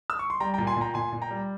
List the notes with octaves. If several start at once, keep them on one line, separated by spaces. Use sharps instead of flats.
E6
C#6
C6
G3 G5 A#5
A#2 G5 A#5
G#5 C6
A#2 G5 A#5
A#2 G#5 C6
A#2
G5 A#5
G3